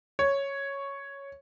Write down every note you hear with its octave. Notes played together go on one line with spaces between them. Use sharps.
C#5